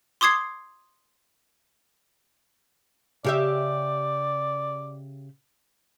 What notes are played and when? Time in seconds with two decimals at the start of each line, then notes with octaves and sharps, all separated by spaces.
0.21 C6 D6 D#6 G#6 C7
3.24 C#3 G4 D5 E5